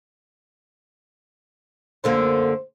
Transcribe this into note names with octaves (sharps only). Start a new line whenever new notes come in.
F#2 D3 A#3 C5